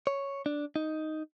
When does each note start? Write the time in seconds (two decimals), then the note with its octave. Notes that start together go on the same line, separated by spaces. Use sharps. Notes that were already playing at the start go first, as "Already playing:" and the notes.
0.07 C#5
0.46 D4
0.76 D#4